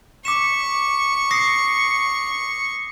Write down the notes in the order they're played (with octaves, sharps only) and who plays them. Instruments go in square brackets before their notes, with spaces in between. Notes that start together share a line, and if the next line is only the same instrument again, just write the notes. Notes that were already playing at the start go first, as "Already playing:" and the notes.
[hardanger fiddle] C#6 [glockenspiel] D6 B6 E7
[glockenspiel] D#6 A#6 C7